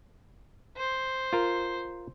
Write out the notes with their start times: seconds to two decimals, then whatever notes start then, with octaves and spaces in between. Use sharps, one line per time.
0.77 C5
1.33 F4 A#4